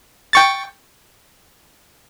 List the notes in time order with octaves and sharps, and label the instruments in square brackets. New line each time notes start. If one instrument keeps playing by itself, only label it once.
[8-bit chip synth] G5 C#6 A6